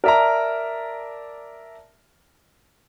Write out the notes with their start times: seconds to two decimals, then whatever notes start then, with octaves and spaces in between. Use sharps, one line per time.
0.04 A#4 D5 E5 A5 A#5